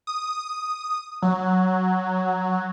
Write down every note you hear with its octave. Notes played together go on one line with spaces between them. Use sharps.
D#6
F#3